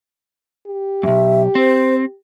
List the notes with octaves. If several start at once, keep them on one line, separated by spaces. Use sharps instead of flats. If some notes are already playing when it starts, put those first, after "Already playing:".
G4
B1 F#2 E5
C4 C5